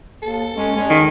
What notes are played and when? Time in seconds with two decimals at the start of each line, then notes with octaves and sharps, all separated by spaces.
0.22 D#2 A4
0.56 F2 G#3 C#4
0.76 E2 G#3 C#4
0.90 D#3